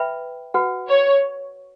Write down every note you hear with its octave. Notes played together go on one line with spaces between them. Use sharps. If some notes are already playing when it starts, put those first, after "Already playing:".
Already playing: B4 E5 G5 B5
F#4 B4 F#5
C#5